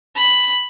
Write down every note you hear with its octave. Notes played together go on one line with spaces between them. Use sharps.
B5